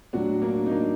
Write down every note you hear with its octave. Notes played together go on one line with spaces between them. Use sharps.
A2 F#3 D4 F#4
A#3 D4
D#4
A#3 D4